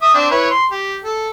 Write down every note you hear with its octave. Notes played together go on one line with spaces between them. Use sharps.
E5 D#6
C4 D4
E4 B4 C#5
C6
G4
A4